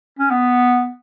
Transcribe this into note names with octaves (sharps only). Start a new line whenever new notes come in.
C#4
B3